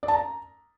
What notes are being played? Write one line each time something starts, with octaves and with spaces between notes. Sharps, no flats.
D5
A5
A#5